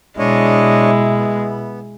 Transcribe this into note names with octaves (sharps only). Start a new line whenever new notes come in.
B2 G#3 D4 E4 C#5 D#5
B3